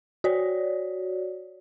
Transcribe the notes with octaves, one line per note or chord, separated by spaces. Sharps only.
F#4 C#5 D5